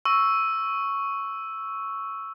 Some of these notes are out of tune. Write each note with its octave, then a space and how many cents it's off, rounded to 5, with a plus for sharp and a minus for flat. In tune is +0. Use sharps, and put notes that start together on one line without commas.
C#6 +0 E6 +0